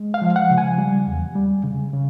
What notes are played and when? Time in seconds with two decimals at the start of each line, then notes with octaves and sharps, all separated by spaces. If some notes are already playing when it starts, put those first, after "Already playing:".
Already playing: G#3
0.14 F5
0.22 F3
0.36 F#5
0.50 C#3
0.58 G#5
0.78 G3
1.07 E2
1.35 G3
1.64 C#3
1.93 C#3